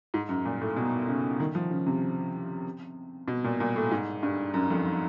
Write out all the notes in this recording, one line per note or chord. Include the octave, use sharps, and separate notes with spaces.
G#2
F#2
A#2
A2
B2
C#3
D#3
F3
C#3
C3
B2
A#2
A#2
A2
G#2
G2
F#2
F2